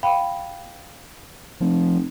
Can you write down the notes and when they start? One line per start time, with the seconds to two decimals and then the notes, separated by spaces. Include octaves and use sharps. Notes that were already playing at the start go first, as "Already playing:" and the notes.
0.03 F5 G5 B5
1.61 F1 F3